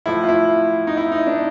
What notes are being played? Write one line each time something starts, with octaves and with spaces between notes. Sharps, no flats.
A2 F3 E4
F4
E4
D#4
E4
D#4
D4